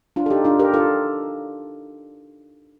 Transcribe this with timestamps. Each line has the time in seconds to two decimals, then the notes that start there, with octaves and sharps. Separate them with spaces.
0.16 D4 F4
0.26 A4
0.30 D#4 G4
0.45 D4 F4
0.59 G4 A#4
0.74 F4 A4